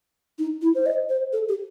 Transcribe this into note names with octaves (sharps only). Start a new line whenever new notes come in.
D#4
E4
C5
D#5
C5
A4
G4